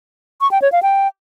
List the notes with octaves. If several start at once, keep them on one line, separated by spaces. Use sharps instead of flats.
C#6
G5
C#5
F5
G5